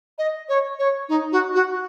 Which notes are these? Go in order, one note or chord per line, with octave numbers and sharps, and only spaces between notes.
D#5
C#5
C#5
D#4
F#4
F#4